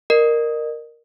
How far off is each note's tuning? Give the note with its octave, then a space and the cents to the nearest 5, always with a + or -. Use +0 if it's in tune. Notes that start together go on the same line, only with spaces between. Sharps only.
A#4 +0 D#5 -40